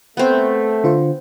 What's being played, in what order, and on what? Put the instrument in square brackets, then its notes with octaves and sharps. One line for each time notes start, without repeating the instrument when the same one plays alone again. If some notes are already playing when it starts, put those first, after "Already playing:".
[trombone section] A3 [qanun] B3 C4
[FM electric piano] D3 F4 C5